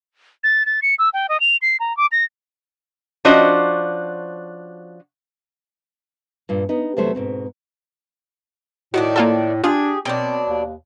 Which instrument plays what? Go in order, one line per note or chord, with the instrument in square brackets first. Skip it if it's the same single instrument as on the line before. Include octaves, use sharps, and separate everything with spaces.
[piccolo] A6
A6
C#7
E6
G5
D#5
F7
C7
A#5
D6
A#6
[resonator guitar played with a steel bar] F3 C#4 D4 F#4 C5 D#5
[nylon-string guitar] G2 A#2
B3 D#4
E2 C3 F#3 A3 C5 C#5
G#2 B2 C4
[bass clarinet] A2 [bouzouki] D#3 A3 D4 [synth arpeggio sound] F#4
[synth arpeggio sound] A#3 F4 A4
[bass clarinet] D4 [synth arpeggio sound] F4 [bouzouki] G4 G#4
[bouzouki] B2 F#3 D4 [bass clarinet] C4 [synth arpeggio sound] G5
[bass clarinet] D#2